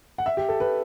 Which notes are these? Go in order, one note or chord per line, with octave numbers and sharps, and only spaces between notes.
F#5
E5
G4
A4
B4